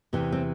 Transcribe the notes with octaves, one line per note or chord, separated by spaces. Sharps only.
E2 C3 E3
C4